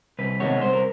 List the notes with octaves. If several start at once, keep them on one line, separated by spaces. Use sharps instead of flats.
C2 B4
C3 D#3 G#3 B3 C#5
C2 C5
A#4